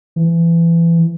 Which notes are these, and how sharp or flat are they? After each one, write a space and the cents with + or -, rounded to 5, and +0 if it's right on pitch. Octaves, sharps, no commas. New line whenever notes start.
E3 +25